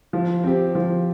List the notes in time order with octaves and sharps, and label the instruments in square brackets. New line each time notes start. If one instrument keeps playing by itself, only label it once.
[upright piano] F3
C4 G4
F3